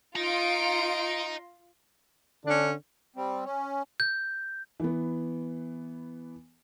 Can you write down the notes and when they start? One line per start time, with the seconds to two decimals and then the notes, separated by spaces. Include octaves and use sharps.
0.16 F4 D#5 A#5 C6 D7
2.46 D3 C#4 D4
3.16 G3 C4
3.45 C#4
4.00 G6
4.80 E3 B3